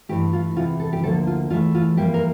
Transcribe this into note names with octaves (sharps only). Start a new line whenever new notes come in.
G2 E3 A3 G4
F4
E2 C3 E3 F4
A4
G4
D2 D3 F3 A#3 A4
F4
E2 E3 A3 F4
F4
F2 E3 G3 A#3 G4
A#4